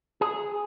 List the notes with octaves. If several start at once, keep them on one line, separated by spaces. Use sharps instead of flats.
G#4